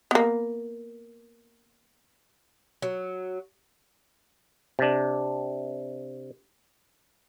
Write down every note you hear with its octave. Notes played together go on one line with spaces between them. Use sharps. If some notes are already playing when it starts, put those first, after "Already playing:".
A#3 B3
F#3
C3 D4